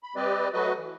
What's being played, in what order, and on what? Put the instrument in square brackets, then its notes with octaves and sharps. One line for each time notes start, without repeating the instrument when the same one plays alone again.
[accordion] B5
G3 C4 G4 B4 D5 D#5
F#3 A3 F#4 B4 D#5
E3